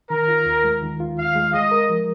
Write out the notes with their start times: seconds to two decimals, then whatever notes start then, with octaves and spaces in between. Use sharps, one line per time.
0.10 D#3 A#4
0.28 F4
0.46 D#2
0.64 G#3
0.82 D#3
1.00 F4
1.17 D#2 F5
1.35 G#3
1.54 G#3 D#5
1.71 A#4
1.89 F3